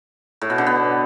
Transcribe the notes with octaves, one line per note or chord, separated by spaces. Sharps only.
A2
B2
D3
B3